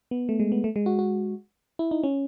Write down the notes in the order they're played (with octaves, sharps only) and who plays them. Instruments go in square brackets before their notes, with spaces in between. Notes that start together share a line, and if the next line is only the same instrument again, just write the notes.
[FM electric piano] B3
A3
G#3
B3
A3
G#3
F#4
F#4
E4
D#4
C#4